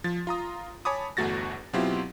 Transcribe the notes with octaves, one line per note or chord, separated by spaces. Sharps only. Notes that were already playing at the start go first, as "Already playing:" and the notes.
F3 A6
F4 A#5 D#6
C#5 G#5 A5 B5 D6 D#6
G1 E2 A3 F#4 A6 A#6
B2 F#3 C4 E4 F4 G4